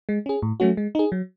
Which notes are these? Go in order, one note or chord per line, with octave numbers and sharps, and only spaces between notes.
G#3
C#4 G#4
A2
F#3 A3 C#4 F#4
G#3
D#4 G#4
F#3